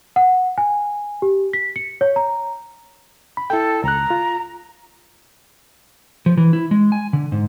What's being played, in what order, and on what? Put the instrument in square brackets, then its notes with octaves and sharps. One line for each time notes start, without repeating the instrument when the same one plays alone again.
[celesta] F#5
G#5
G4
B6
C#7
C#5
A#5
[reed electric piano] B5
[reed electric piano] E4 G5 [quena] A4
[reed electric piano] C#2 F#6 [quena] A#5
[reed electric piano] F4
[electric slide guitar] F3
E3
E4
G#3
G#5
D3
G#2